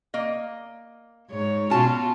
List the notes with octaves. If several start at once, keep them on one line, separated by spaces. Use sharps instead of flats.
A#3 D#5
G#2 C#5
B2 C#4 F4 F#4 A5